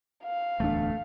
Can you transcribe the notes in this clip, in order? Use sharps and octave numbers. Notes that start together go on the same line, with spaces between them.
F5
D1 E2 A3 D4